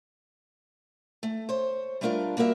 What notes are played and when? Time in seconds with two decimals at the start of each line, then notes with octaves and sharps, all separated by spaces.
1.23 A3
1.49 C5 C#5
2.01 G3 A3 D4 F4 A#4 F5
2.37 G3 A#3 F#4 A#4 E5